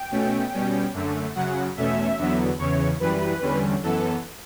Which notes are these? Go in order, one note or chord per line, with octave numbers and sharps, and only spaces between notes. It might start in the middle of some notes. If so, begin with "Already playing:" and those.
Already playing: G5
B2 A3 C#4
B2 G3 C#4
F#2 D3 A3
F#2 C#3 F#3 F#5
E2 B2 A3 C#4 E5
E2 D3 F#3 B3
E2 C#3 E3 C#5
F#2 E3 G3 B4
E2 D3 G3 C#4
F#2 E3 B3 A4